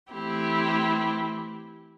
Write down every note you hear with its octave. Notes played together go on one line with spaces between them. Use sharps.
E3 A3 C4 E4 G4